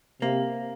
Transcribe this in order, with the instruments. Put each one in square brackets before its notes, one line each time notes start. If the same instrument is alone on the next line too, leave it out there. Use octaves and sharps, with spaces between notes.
[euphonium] C3 [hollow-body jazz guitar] A#3